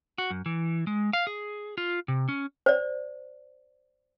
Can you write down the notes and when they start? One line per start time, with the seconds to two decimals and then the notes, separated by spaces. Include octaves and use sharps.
0.18 F#4
0.31 F#2
0.46 E3
0.87 G#3
1.13 F5
1.27 G#4
1.78 F4
2.08 C3
2.29 C#4
2.66 C5 D5